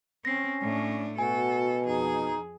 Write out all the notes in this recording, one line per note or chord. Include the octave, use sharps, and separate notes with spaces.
C4 C#4 A#6 C7
A2 D4
B2 F#4 A4 G#5
F2 D#4 G#4